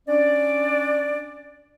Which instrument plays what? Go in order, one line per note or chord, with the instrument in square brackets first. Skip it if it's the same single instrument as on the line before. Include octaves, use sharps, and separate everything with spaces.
[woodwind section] C#4 D4 D5